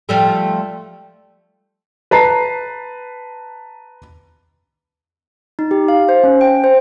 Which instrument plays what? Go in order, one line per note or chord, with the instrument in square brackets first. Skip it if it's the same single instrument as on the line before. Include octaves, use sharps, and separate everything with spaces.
[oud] F3 G3 A3
[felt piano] B4 A5 A#5 C7
[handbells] D#4
G4
F5
C5
C#4
G5
C5